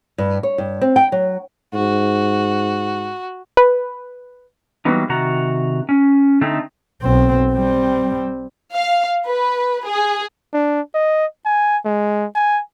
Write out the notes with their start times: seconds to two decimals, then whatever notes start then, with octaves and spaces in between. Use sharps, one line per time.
0.18 G2
0.43 C#5
0.58 G2
0.81 C4
0.96 G5
1.12 F#3
1.74 G#2 F#4
3.57 B4
4.85 E3 F#3 G3 A#3 B3 D#4
5.09 C3 D#3 F#4 F#5 A#5
5.89 C#4
6.41 D3 A3 C4 D#4
7.02 B1 C4
7.53 G3 C4
8.73 F5
9.25 B4
9.84 G#4
10.53 D4
10.94 D#5
11.45 G#5
11.85 G#3
12.35 G#5